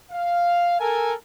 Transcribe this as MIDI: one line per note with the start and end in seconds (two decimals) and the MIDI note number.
0.12 0.79 77
0.79 1.13 69
0.79 1.13 70
0.79 1.13 80